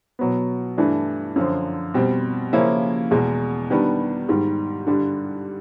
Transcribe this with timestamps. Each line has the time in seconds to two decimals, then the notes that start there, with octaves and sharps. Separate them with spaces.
0.19 B2 F#3 B3
0.77 G2 E3 A3 D4
1.36 F#2 D3 F3
1.94 B2 G3 C4
2.53 C#3 F3 A#3 C#4 E4
3.11 E2 B2 G#3
3.70 D#3 G3 B3 D4
4.29 G#2 D#3 G3
4.87 G2 D3 G3